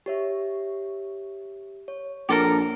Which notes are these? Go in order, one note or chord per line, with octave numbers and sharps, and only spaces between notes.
G4 C#5 E5
C#5
A#1 G4 A4 A#4